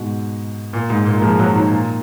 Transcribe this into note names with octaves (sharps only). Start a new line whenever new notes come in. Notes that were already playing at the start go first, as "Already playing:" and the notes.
Already playing: G#2 B2
A#2
G#2
A#2
A#3
F3 G#3
F#3 A#3
D#3 F#3
A#2